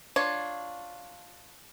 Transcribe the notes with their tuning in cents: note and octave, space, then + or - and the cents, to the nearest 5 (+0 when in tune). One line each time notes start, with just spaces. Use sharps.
D4 +5 F4 +10 C#5 +0